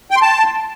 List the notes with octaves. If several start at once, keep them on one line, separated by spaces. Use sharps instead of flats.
G5
C6
A5